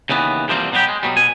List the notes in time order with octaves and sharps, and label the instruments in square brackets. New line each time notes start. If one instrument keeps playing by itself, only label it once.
[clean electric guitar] D#2 C#3 E3 B3
E2 C3 F3 G3 A#3 C4
B2 F#3 B3 F4 G4
G#3
B2 F#3 G3
B2 G#5